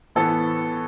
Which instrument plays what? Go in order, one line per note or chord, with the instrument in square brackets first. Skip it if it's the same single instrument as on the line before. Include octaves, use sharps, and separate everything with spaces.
[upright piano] A2 E3 B3 A4